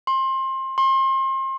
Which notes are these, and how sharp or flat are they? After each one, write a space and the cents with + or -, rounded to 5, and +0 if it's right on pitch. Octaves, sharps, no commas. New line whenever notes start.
C6 +25
C6 +35